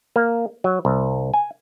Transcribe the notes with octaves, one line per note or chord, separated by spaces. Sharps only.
A#3
F#3
C2
G#5